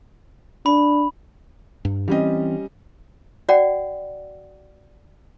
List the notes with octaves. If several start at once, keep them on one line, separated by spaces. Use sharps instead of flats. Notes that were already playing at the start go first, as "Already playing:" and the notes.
D4 B5
G2
E3 G3 C4 C#4 D#5
F#4 D5 F#5 G5